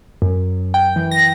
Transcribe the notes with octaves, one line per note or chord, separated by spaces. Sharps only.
F#2
G5
E3
A#6